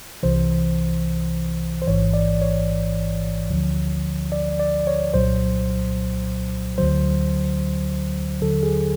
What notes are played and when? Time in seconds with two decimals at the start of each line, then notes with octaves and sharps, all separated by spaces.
0.23 C2 C3 E3 C5
1.82 C5
1.87 A1 G#2 E3 C#5
2.14 D5
2.42 C#5
3.50 D2 D3 F3
4.32 D5
4.59 D5
4.87 C#5
5.14 C2 A#2 F#3 C5
6.78 D2 D3 F#3 C5
8.41 D#2 D3 F#3 A4
8.63 G#4